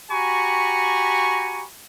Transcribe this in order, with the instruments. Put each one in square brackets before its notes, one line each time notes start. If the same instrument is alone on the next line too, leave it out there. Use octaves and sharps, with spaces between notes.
[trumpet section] F#4 G4 G#5 A#5 B5 C#6